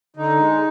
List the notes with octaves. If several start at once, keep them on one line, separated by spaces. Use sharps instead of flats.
D3 D#4
G#3